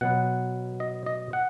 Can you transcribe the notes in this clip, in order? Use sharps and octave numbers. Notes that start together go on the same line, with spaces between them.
B2 F#3 B3 F#5
D#5
D#5
F#5